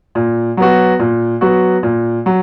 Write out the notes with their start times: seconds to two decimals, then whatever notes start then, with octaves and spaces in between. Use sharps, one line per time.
0.15 A#2
0.57 F#3 B3 F#4
0.99 A#2
1.41 F#3 B3 F#4
1.83 A#2
2.26 F#3